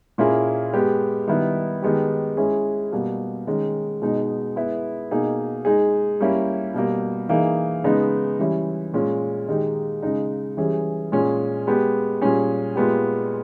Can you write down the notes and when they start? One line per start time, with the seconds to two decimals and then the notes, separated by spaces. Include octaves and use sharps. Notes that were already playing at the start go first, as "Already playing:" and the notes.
0.18 A#2 A#3 C#4 E4 G#4
0.73 G#3 B3 G4
1.28 D#3 G3 B3 E4
1.82 D#3 G#3 B3 G4
2.37 G#3 C#4 E4 G#4
2.92 B2 G3 A#3
3.47 D#3 G#3 C#4
4.02 B2 G#3 D#4
4.56 G#3 B3 E4
5.11 B2 A#3 D#4 G#4
5.65 G#3 D#4 G#4
6.20 G3 A#3 C#4 E4
6.74 B2 G3 A#3
7.29 E3 A#3 D#4 G#4
7.84 C#3 G#3 B3 D#4
8.39 E3 G3 C#4 E4
8.94 A#2 G#3 C#4
9.48 D#3 G#3 D#4 G4
10.02 C#3 G#3 D#4
10.57 E3 G3 C#4 G#4
11.12 A#2 G#3 C#4 G#4
11.67 G#3 B3 G4
12.22 A#2 G3 C#4 G#4
12.76 A#2 G#3 B3 G4